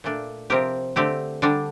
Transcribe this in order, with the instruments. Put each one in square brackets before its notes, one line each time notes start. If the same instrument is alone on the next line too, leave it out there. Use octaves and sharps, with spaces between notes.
[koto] A#2 A3 D4
C3 F3 C4 G4 A#4
D3 A3 C4 G4
D3 G3 D4